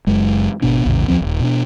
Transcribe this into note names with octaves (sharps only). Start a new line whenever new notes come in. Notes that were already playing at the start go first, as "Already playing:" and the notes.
F#1 F#2 G#3
G#1 B2 B3 D4
A#1 E2 A2 C#3
D#2 F3 C4
D#1 C2
B2 D4